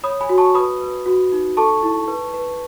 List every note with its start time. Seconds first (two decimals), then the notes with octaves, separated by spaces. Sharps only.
0.04 C#5 B5 D#6
0.21 G#5 B5
0.29 F#4
0.38 A5 C#6
0.54 B4 B5 D#6
0.81 B4
1.06 F#4
1.32 D#4
1.57 A4 A5 C#6
1.83 E4
2.08 B4
2.34 B4